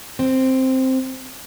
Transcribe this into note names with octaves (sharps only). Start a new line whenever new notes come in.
C4